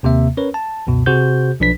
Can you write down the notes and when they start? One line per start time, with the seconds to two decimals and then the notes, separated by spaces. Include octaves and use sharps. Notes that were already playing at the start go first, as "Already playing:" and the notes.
0.03 D#2 C3 A#3 E5
0.37 C#4 A#4 B4 C#5
0.54 A5
0.87 C#2 F#2 B2
1.06 C3 F#4 G#4 C5 G6
1.60 B1 F3 D4 B4 B6